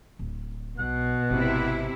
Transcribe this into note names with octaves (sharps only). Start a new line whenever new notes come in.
D1
B1 B2 F#5
G#1 C3 E4